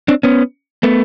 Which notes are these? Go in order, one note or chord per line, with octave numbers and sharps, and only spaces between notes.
C4 D4
B3 C#4
A3 B3